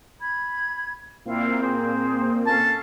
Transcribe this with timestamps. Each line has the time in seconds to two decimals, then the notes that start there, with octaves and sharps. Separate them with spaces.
0.21 B5 G#6
1.25 A#2 A#3 C4 E4 F4 F5
1.61 G#4 C5
2.46 C#4 A4 F5 A5